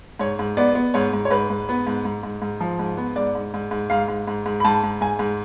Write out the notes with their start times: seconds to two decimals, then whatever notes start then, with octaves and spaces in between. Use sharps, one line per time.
0.19 G#2 C#5
0.39 G#2
0.57 B3 D5
0.75 B3
0.94 G#2 C#5
1.13 G#2
1.25 C#5
1.31 G#2 B4
1.50 G#2
1.69 B3
1.87 G#2
2.05 G#2
2.23 G#2
2.42 G#2
2.60 F3
2.79 G#2
2.97 B3
3.16 G#2 D5
3.35 G#2
3.54 G#2
3.71 G#2
3.90 G#2 F5
4.08 G#2
4.27 G#2
4.46 G#2
4.60 B5
4.65 G#2 A5
4.83 G#2
5.01 G#2 G#5
5.19 G#2